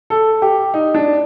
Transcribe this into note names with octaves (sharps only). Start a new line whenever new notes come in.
A4
G4
D#4
D4